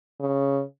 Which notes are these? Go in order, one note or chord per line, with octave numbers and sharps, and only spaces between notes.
C#3